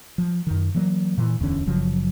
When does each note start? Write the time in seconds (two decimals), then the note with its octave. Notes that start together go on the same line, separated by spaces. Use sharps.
0.18 F3
0.47 F#2 D#3
0.75 E3 F#3 A#3
1.18 A#2 E3
1.39 D1 E2 D3 C#4
1.66 F#1 C#3 F3 F#3